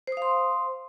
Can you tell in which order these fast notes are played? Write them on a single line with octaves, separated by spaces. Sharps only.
C5 D#6 F5 C6